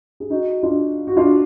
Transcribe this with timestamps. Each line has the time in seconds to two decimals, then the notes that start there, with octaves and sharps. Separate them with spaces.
0.20 G#4
0.30 D#4 F#4
0.63 D4 F4
1.07 F#4
1.17 D4 F4